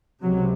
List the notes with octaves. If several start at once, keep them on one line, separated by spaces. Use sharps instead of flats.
C#2 C3 F#3